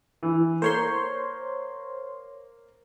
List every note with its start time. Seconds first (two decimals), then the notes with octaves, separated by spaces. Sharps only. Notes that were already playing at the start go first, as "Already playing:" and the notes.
0.23 E3
0.62 A#3 C5 C#5 C6